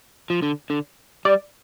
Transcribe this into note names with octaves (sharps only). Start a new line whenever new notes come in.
F3
D3
D3
G3 D5